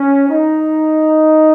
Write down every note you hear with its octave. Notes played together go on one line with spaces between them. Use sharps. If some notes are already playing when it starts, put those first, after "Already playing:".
Already playing: C#4
D#4